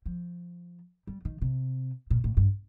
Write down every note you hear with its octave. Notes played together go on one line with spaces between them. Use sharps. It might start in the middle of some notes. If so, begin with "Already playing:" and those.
F3
G3
D#3
C3
A#2
A2
G2